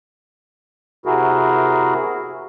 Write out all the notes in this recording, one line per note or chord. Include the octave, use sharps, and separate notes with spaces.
C3 E4 F#4 G#4 A#4